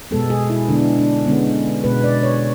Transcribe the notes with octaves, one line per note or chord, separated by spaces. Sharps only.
B2 G#3 B3 A4
G#4
E4
D3 G#3 B3 D4
D4
D3 G#3 B3 C#4
B2 G#3 B3 B4
D5
C#5